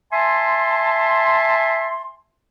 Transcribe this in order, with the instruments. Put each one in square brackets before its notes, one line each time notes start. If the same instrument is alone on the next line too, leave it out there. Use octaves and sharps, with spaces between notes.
[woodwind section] E5 G#5 A5 C6